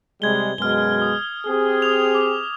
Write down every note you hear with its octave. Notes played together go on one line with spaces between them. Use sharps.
C3 G3 G#3 G#6 G7
F#2 B2 G#3 F6 G7
D#6
C4 G4 G#4
D#6 F6 F7
D6 F7